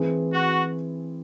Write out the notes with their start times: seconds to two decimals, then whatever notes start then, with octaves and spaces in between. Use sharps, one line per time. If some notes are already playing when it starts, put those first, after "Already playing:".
Already playing: E3 C4 E4 G#4
0.33 F#4